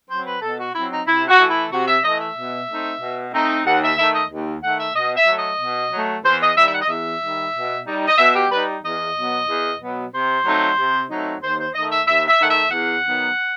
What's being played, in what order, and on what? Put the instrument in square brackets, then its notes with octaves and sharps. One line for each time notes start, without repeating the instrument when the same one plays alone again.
[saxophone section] F#3 C4 C5
B4
B2 A4
F#4
F#3 C4 E4
D#4
C3 E4
F#4
E3 A3
E4
C3 F#4
E5
E3 A3 D#5
E5
B2
A3 C4 D#4
B2
A3 C4 D#4
D#2 F#5
E5
D#3 A3 E5
D#5
D#2
D#3 A3 F#5
E5
B2 D#5
E5
F#3 A3
D#5
B2
F#3 A3
E2 C5
D#5
D#3 G3 E5
E5
F#5
D#5
E2 E5
D#3 G3
B2
G3 D#4
D#5
B2 E5
G4
G3 D#4 B4
E2 D#5
B2 F#3 B3
E2
B2 F#3 B3
C3 C5
F#3 A3 C4 D#4
C3
F#3 A3 C4 D#4
D#2 C5
C5
D#3 A3 D#5
E5
D#2 E5
E5
D#3 A3 F#5
E5
E2 F#5
D#3 F#3 B3